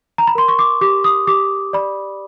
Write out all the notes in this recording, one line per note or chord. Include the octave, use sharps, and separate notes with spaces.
A#5
B5
A#4 C6
C#6
D6
G4 D6
D#6
G4 D6
D5 B5